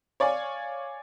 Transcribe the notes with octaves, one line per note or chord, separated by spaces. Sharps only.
C#5 D5 F5 G#5